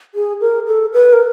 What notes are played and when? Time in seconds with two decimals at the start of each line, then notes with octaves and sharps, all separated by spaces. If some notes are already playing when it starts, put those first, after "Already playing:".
0.15 G#4
0.41 A#4
0.67 A4
0.94 B4
1.13 A#4